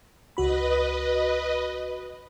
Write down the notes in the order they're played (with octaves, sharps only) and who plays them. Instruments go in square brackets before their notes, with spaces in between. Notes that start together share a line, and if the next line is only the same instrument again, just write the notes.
[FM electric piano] C#2 F#4 B5 [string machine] B4 D#5